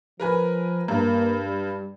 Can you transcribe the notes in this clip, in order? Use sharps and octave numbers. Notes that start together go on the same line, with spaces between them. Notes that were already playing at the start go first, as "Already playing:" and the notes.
F3 A#4 B4 G#5
G2 A#3
G3